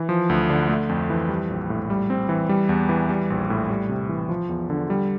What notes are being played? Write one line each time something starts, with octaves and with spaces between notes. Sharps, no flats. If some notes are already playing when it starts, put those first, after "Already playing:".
Already playing: E3
F3
D2
D3
A3
F2
E3
G3
A#1
A2
G3
C4
E3
G3
E2
E3
G3
A#1
A2
G3
C3
E3
F3
E2
D3
G3